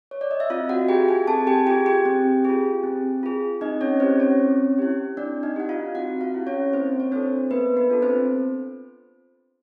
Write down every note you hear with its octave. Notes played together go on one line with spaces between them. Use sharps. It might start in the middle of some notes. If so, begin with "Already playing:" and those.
C#5
D5
D#5
E5
C4 F4 F5
F#4 F#5
F4 G4 G#4 G5
G#4 G#5
C4 A4 A5
G4 G5
F4 G4 G#4 G5
G4 G5
C4
F4 G#4
C4
F4 G#4
C4 D#4 D#5
C#4 C#5
C4 E4 G4 C5
C#4 C#5
C4
E4 G4
C4 D4 D5
D#4 D#5
E4 G4 F#5
F4 F5
C4 F#4 F#5
F4 F5
E4 G4
C#4 C#5
A#3 C4 C5
C#5
C4 D4 F4 A4 C5
A#3 B3 B4
B3 B4
D4 F4 A4
C4 C5